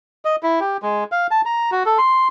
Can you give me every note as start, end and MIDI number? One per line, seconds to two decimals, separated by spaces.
0.25 0.36 75
0.43 0.60 64
0.60 0.77 67
0.83 1.04 56
1.12 1.27 77
1.31 1.41 81
1.45 1.70 82
1.72 1.83 66
1.86 1.98 69
1.98 2.28 84